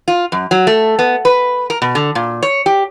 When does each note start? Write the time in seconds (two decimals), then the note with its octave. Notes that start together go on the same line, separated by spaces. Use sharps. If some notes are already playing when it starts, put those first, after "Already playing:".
0.08 F4
0.32 F#2
0.51 F#3
0.67 A3
0.99 B3
1.25 B4
1.70 A#4
1.82 B2
1.95 D3
2.15 A#2
2.43 C#5
2.66 G4